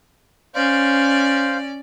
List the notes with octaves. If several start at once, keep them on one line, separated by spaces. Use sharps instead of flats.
C#4 C5 D5 F5